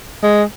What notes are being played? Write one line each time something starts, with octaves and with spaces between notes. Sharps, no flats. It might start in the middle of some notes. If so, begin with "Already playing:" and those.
G#3